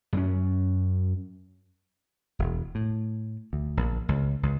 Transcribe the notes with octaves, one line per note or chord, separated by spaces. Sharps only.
F#2 C4 C#4
E1
A2
D2
A#1
C#2
C#2